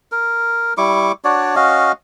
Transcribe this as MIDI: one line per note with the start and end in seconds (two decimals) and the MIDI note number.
0.12 0.74 70
0.78 1.12 55
0.78 1.12 64
0.78 1.12 85
0.78 1.12 86
1.24 1.56 62
1.24 1.56 66
1.24 1.56 73
1.24 1.56 74
1.56 1.92 61
1.56 1.92 66
1.56 1.92 75
1.56 1.92 77